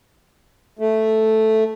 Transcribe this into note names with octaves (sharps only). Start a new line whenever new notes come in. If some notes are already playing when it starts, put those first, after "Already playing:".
A3